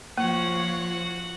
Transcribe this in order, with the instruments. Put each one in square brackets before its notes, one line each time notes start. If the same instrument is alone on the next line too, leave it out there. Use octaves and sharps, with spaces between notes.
[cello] F3 [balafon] A#3 [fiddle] F#4 F#5 [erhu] C#5